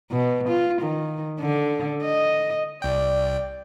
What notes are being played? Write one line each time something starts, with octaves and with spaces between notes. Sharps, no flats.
B2
F4
D#3
D3
D#5
C2 D5 G5